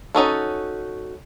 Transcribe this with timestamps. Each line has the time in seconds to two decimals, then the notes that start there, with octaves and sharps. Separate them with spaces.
0.15 C#4 D#4 F#4 A4